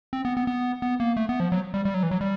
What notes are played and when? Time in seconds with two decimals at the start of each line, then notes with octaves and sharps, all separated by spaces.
0.13 C4
0.25 B3
0.37 B3
0.47 B3
0.82 B3
1.00 A#3
1.17 A3
1.29 B3
1.40 F3
1.52 F#3
1.74 G3
1.85 G3
1.94 F#3
2.03 E3
2.11 F#3
2.21 G3